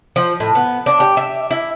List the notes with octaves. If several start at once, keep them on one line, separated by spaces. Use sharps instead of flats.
F3
A2
B3
D4
G4
E5
E4